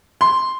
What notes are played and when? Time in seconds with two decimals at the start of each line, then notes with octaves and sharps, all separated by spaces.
0.21 C6